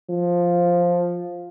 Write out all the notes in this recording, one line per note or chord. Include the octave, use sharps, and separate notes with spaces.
F3